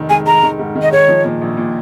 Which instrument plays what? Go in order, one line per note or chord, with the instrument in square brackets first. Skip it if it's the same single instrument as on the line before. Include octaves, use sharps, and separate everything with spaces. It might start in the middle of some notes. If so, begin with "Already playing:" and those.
Already playing: [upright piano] F1 D#3
[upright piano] G#3 [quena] G#5
[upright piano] G#3 [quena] A#5
[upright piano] D#3
G#2
D#3
[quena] D#5
[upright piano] G#3 [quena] C#5
[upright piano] F3
A#2
A#1
A#2